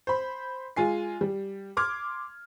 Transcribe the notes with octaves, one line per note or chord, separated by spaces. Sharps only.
C5 B5
G#3 F4 G#5 C7
G3
C6 D6 F6 G#6